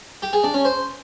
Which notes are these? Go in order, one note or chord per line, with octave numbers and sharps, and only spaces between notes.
G4
G#4
D4
C#4
C5